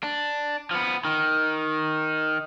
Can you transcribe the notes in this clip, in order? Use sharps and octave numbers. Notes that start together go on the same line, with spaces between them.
D4
F3 B3
D#3